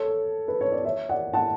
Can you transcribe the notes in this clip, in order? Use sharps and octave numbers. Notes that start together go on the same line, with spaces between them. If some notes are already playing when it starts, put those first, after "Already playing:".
Already playing: A4 C#5
B4
C#5
D5
C#5 E5
D5 F#5
F#5 A5